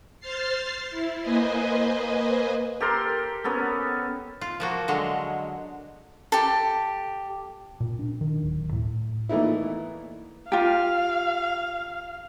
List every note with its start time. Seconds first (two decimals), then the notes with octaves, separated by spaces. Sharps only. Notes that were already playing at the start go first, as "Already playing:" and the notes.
0.20 C5 F6 A6 C7
0.90 E4
1.22 A#3 B4 C5 D#5 G#5
2.80 G4 A4 A#4 C6
3.44 B3 C#4 A4 A#4
4.41 F4
4.60 F3 A#3 F#4
4.88 D3 F#3 G#3
6.32 G4 A4
7.80 A#2
7.99 D4
8.21 D#3
8.42 D1
8.73 A2
9.29 A#2 E3 A3 B3 D#4 E4
10.52 F4 G4 F5